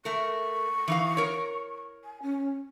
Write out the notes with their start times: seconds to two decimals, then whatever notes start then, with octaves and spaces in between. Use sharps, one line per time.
0.05 A3 A#4 C#6
0.88 E3 D#4 F5
1.17 A#4 C#5
2.04 G#5
2.22 C#4